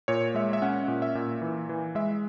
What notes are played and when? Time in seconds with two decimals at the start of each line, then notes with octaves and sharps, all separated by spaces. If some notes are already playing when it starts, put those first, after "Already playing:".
0.08 A#2 C#5
0.34 G#3 E5
0.53 E5
0.62 C#4 F#5
0.88 A#2
1.02 E5
1.15 A#2
1.42 E3
1.69 E3
1.95 G#3 E5